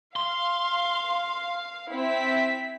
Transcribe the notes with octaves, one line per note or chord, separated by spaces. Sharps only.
F5 C6
C4 E4 B6